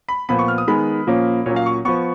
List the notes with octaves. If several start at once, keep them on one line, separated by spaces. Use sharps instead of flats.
B5
A#2 F3 B3 B5
C#6
F6
D#6
D#3 G#3 B3 B5
A#2 F3 A#3 C#4
A#2 F#3 C#4 C#5
F5
C#6
F3 B3 C#6